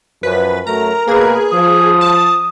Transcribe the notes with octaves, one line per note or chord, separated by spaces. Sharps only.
F#2 F3 B4
F#2 F#3 A3 A#4 A#5
B2 A#3 G#4 B4
F3 D#6
A5